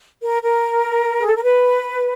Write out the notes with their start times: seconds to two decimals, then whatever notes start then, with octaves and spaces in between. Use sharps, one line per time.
0.22 A#4
0.42 A#4
1.19 G#4
1.27 A4
1.35 A#4
1.42 B4